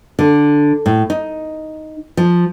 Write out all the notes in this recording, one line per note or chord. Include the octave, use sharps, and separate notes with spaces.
D3
A2
D#4
F3